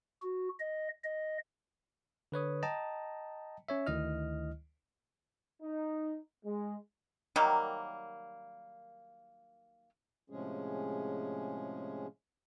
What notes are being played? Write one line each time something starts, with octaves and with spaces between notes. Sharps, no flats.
F#4
D#5
D#5
D3 B4 C#5 D#6
D#5 G5 A5 A#5
C#4 C#5 E5
D2 D#3 E4 D#5 F6
D#4
G#3
D#3 F#3 G3 A#3
A2 C3 F3 G#3 C#4 G#4